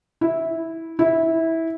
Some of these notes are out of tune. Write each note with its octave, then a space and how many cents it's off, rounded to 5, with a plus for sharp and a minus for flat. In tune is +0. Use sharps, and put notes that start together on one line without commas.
E4 -10
E4 -15